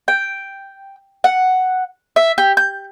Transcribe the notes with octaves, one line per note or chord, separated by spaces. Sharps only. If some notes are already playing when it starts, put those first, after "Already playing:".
G5
F#5
E5
G4
G6